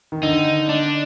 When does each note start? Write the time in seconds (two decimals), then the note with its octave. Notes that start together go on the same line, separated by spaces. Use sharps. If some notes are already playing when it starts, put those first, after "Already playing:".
0.12 D#3
0.23 D3 D#4
0.69 D4